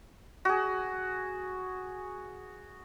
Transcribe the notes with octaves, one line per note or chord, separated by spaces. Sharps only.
F#4 G#4